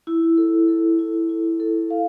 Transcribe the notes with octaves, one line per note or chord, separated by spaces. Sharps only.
E4
A4
A4
E4
E4
A4
F5